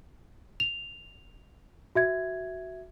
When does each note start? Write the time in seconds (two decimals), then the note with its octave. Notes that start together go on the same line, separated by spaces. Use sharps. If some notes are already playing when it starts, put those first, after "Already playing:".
0.60 F7
1.95 F#4 E5 G#6